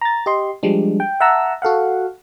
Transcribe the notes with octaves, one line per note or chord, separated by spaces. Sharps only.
A#5 A6
G4 D#5 C6
F3 G3 G#3 D4
G5
E5 F#5 A5 A#5 E6
F#4 A4 F5 F#5